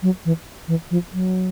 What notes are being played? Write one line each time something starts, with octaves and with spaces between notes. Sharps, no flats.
F#3
E3
E3
F3
F#3